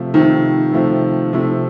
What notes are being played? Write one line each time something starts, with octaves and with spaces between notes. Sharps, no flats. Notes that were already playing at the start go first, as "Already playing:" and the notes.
Already playing: C3 F3 A3
C3 D#3 F3 A3
C3 F3 A3
C3 F3 A3